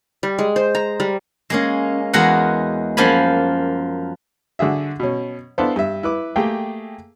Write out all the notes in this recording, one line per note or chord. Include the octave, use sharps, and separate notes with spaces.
G3
G#3
C5
A#5
G3
G#3 A#3 C#4
E2 G#3 F#4 A#4 F#5
F#2 F3 A#3 G#5 B5
D3 F#4 G#4 E5
B2 C#4
B3 D4 E4 A4 C5 F5
G2 E5
E4 B4 D6
A3 A#3 G4 G#4 G5